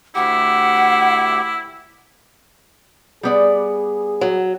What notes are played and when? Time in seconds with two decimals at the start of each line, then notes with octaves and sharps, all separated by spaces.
0.15 D2 E4 G4 F#5
3.23 G3 B3 G#4 D5
4.21 F#3